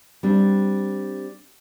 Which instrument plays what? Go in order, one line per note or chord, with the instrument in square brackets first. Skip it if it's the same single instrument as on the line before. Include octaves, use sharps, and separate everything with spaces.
[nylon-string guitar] G3 C4 D4